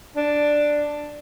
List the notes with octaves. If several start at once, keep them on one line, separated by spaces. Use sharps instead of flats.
D4